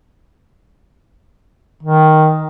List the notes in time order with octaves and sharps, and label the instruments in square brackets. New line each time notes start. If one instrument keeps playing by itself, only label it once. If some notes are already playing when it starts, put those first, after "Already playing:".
[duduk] D#3